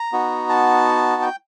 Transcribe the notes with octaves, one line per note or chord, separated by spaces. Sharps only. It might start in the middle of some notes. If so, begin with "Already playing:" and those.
Already playing: A#5
B3 D#4 F#4
A5
G5